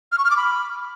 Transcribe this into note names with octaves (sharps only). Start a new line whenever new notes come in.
F6
C#6
F6
D6
B5